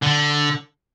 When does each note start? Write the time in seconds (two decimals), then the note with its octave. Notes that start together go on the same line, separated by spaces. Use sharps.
0.03 D3